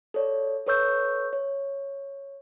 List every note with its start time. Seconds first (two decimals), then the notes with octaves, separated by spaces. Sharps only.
0.14 A4 C#5 D5
0.66 A4 B4 C#5 C#6 E6 G6
1.33 C#5